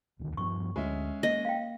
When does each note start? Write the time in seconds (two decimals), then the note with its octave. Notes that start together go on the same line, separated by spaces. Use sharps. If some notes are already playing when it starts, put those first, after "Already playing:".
0.19 D#1 D2 D#3
0.37 G2 F3 B3 C#6
0.76 D2 G#3 C#4 E5
1.23 A#3 D#5
1.45 F5 G5